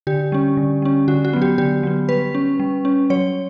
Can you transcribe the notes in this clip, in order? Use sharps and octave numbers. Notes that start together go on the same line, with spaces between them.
D3 G4
G3 C#4
D3
G3 C#4
D3 F#4
F#4
F#3 B3
G4
D3 G4
F#3 B3
G3 B4
C#4
G3
C#4
F#3 C#5